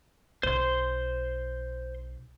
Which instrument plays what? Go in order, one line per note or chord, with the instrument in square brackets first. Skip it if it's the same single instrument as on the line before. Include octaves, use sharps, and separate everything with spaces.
[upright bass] B1 [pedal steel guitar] C5 C6